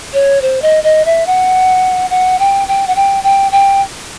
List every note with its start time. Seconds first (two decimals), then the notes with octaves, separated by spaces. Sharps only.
0.13 C#5
0.42 C5
0.62 D#5
0.84 D#5
1.05 E5
1.27 F#5
2.10 F#5
2.39 G5
2.68 G5
2.87 F#5
2.96 G5
3.24 G5
3.52 G5